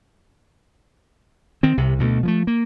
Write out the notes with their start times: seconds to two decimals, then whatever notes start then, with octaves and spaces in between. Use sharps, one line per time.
1.63 D#3 C4
1.78 C2 C3
1.99 D2 B2 F#3 A3
2.23 F3 G#3 A3
2.47 A#3